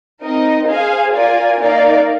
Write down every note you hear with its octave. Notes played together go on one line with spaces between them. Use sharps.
C4 D#4 A#4 D#5
G#4 C5 F5 G#5
F4 A#4 D5 G#5
A#3 D#4 A#4 D5 F5